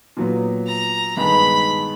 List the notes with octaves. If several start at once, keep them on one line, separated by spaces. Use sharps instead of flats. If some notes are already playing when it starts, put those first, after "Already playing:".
A#2 F#3 B3
A#5
G2 D#3 G#3 B3 B5